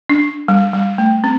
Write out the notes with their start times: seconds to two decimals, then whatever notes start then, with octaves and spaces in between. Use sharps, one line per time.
0.10 D4
0.48 G3
0.73 G3
0.98 A3
1.24 C4